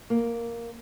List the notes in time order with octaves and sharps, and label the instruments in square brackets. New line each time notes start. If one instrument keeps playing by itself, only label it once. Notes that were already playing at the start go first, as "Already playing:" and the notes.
[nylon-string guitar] A#3